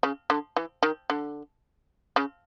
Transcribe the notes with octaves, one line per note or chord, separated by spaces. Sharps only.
C#3
D3
E3
D#3
D3
C#3